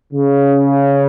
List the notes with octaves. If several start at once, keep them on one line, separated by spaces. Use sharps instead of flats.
C#3